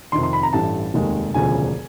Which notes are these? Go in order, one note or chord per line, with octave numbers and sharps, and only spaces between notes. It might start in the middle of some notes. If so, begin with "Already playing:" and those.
F2 C3 D#3 C6
C6
B5
A#5
A1 G2 E3 A3 A5
F1 D#2 D#3 G#3
E1 D2 C#3 F3 G#5